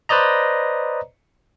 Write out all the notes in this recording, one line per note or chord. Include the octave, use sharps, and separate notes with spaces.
B4 C5 D5 D#5 A#5